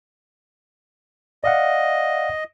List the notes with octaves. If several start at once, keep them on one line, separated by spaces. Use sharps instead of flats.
D5 D#5 F5 F#5